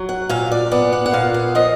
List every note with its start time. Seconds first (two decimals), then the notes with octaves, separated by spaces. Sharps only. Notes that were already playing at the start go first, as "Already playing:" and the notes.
Already playing: F#3
0.09 F#5
0.29 A#2 F5
0.52 D5
0.71 B3 D5
0.92 F#5
1.06 F#5
1.13 A#2 F5
1.34 F5
1.55 F3 D#5